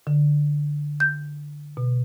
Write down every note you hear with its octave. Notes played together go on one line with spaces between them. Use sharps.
D3
G6
B2